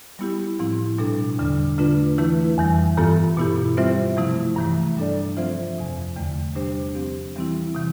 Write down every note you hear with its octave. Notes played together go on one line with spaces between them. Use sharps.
G3 B3 E4 G4
A2 F3 C4 E4
B2 G3 D4 A4
E2 D3 G3 D4
D3 A3 D4 F4 B4
E3 A3 E4 B4
F2 E3 G3
G2 E3 B3 F4 A4
B2 B3 E4 G4
G3 C4 F4 C5 E5
C3 F3 A3 E4
G2 E3 A3
G3 D4 A4 D5
F3 C4 F4 C5 E5
F2 C3 F3
E2 D3 A3
C3 G3 D4 G4 C5
F3 C4 G4
E3 G3 C4 E4
C3 E3